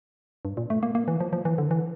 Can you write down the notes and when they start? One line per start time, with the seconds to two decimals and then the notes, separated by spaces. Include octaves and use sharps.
0.45 G2
0.57 A#2
0.70 A3
0.83 A#3
0.95 A#3
1.08 E3
1.20 F3
1.33 F3
1.45 E3
1.58 D3
1.71 E3